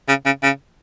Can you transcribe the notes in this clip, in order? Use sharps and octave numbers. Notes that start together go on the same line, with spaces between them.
C#3
C#3
C#3